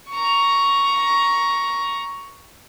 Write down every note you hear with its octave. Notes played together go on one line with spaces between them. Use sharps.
A#5 C#6